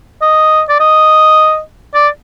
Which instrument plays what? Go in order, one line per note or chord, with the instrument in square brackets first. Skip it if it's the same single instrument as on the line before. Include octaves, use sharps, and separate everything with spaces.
[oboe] D#5
D5
D#5
D5